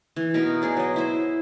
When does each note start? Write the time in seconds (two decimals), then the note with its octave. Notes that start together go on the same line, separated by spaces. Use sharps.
0.16 E3
0.34 B2 D#4 A#4
0.62 D#4 G#4 D5
0.77 F#3 D#5
0.96 E4 C5